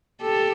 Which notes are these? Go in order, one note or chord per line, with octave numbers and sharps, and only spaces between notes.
G4 A4